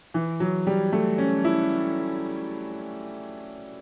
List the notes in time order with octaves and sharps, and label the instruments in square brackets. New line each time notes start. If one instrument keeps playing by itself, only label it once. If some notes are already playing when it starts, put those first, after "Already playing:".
[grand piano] E3
F#3
G3
A3
C#4
E4